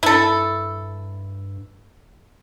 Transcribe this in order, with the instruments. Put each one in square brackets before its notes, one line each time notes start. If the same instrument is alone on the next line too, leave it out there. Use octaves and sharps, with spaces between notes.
[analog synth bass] G2 [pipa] E4 A4